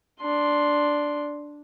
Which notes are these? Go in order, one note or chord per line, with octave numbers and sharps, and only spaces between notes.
D4 C6